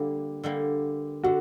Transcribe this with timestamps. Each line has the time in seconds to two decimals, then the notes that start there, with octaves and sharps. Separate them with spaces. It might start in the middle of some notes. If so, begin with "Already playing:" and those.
Already playing: D3 G3 A#3
0.43 D3 G3 A#3
1.24 D3 F#4